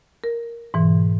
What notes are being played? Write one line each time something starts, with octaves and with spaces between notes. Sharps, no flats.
A#4
G#2 B2 E3